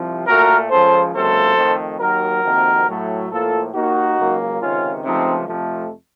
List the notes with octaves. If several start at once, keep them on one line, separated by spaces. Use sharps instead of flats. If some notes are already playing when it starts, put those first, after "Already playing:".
Already playing: C2 C3 F3
A#2 A3 F#4 A#4
C#2 C#3 F3 A4 C5
C#2 C3 F#3 A#3 A4 C5
F2 D#3 A3
D#2 D#3 F#3 F#4 A#4
F2 C3 D#3 A#3
A2 F#3 A3
A2 F3 A#3 F4 A4
D#2 D#3 A#3 D#4 F#4
C#2 C#3 F#3 A#3
C#2 C3 D#3 C#4 F4
C#2 C3 F3 A3 C4 D#4
F2 C3 F3 A3